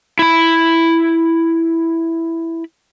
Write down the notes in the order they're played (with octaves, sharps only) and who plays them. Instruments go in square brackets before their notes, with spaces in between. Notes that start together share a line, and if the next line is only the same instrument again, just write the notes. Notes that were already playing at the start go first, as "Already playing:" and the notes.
[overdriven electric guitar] E4 B5